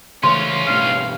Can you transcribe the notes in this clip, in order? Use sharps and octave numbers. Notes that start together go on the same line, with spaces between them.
C#3 E3 A3 C#4 F4 C6
A1 G2 B2 F5